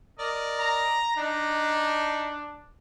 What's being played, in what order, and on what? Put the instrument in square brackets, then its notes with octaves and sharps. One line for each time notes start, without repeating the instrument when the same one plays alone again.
[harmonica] A#4 D5 D#5
[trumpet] A#5
[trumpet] D4 [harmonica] D#4